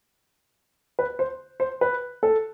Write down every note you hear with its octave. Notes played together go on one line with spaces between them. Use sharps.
B4
C5
C5
B4
A4